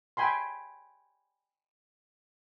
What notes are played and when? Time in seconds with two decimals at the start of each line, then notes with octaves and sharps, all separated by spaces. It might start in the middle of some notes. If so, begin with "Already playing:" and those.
0.17 G5 G#5 B5 C6